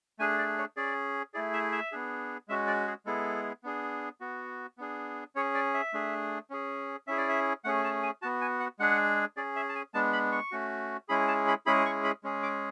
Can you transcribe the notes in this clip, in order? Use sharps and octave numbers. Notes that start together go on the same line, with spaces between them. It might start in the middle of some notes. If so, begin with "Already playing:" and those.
A3 D4 G#4 G#5
D5
C#5
C#4 G#4 D5
A3 E4 G#4 D5
E5
E5
B3 D4 G#4
G#3 C#4 F#4 E5
D5
G#4
G#3 B3 E4 G#4 A4
B3 D4 G#4
B3 F#4
B3 D4 G#4
C#4 G#4 C#5
D5
E5
A3 D4 G#4
C#4 G#4
C#4 E4 G#4 E5
D5
E5
A3 C#4 G#4 F#5
A5
G#5
B3 F#4 A5
G#5
F#5
G#3 D4 G#4 F#5
C#4 G#4 D5
E5
A5
G#5
G#3 B3 D4 A5
B5
C#6
A3 C#4 F#4
G#3 C#4 E4 G#4 B5
A5
B5
G#3 C#4 E4 G#4 B5
C#6
B5
G#3 C#4 G#4
D6